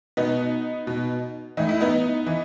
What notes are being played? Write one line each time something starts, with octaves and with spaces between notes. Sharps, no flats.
B2 B3 D#4
B2
A2 E3 D#4
E4
B3 D#4
E3